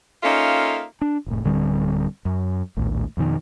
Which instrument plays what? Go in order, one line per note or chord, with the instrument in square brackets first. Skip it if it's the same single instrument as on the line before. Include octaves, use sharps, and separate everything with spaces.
[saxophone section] A#3 C#4 D#4 F4 A4 E5
[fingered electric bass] D4
F1 A2
D1 D3 G3 C4
F#2
A#1 D#2 A2
F2 B2 D#3